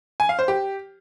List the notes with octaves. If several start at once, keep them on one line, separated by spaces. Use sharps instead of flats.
G#5
F5
C5
G4